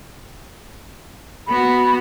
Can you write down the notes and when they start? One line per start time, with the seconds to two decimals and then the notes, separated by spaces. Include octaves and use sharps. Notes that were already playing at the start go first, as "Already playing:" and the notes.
1.47 B3 F#4 B5